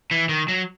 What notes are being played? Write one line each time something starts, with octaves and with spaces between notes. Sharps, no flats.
E3
D#3
F#3